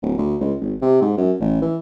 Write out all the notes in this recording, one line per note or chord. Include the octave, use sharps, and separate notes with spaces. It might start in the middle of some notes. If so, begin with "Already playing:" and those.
D1
D2
C#2
G#1
C3
G#2
F#2
A1
E3